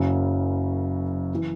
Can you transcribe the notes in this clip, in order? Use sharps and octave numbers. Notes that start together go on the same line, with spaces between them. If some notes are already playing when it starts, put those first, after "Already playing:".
Already playing: F#1 F#2 C#3
E3